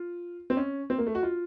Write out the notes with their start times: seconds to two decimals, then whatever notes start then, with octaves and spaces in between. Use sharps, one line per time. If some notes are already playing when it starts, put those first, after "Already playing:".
Already playing: F4
0.50 C4
0.57 C#4
0.90 C4
0.98 A#3
1.07 A3
1.15 F#4
1.23 F4